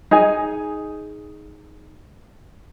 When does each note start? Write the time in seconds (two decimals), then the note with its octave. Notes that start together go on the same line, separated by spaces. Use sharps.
0.11 D#4 G#4 G#5